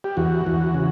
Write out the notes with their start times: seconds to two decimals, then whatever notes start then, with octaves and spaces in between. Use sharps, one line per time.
0.04 G4
0.17 E2 F#4
0.46 E2
0.74 C#3